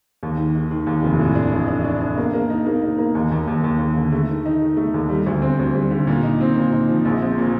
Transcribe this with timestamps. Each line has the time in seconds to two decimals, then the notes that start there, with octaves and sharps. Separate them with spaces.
0.23 D#2
0.38 D#3
0.55 D#3
0.71 D#3
0.87 D#2
1.03 F1
1.19 A2
1.35 D4
1.52 A1
1.68 D4
1.84 D4
2.01 D4
2.18 A#3
2.33 A#3
2.50 D#4
2.67 A#3
2.82 D#4
2.98 A#3
3.15 D#2
3.31 D#2
3.48 D#2
3.64 D#2
3.79 D#2
3.97 D3
4.12 A3
4.29 D#3
4.46 D#4
4.61 D#3
4.77 A3
4.94 D#2
5.10 G3
5.26 D2
5.42 C4
5.59 D2
5.75 G3
5.91 D3
6.07 A#2
6.23 D#4
6.41 C4
6.57 A#2
6.73 D#4
6.89 F3
7.05 A#1
7.21 C4
7.38 A#2